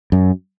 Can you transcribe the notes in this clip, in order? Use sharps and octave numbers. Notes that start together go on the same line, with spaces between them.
F#2